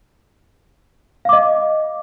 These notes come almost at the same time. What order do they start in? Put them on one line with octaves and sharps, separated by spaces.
F5 D6 D#5